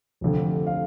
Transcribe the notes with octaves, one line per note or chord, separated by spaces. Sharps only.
F1 F2 D3
F5